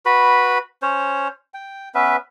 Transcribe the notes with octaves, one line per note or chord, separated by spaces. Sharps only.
F#4 B4 B5
C#4 C5 C#5
G5
B3 C#4 B4 E5